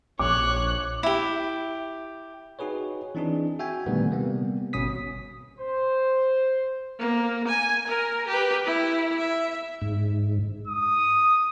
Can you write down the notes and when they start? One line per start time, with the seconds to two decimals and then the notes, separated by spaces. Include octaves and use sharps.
0.19 A#1 C#5 D6 F#6
1.03 E4 G4
2.59 D#4 F#4 G#4 B4 C#5
3.15 E3 C4 D4 D#4 G#4
3.59 F#4 E5 G5 G#5
3.86 A#2 D3 D#3 G3 A3 B3
4.11 C3 G3 A#3 B3
4.73 G#1 B2 C#4 D#6 B6
5.60 C5
6.99 A#3
7.48 G#5
7.88 A#4
8.28 G4 B4
8.65 E4
9.18 E5
9.81 G#2
10.67 D#6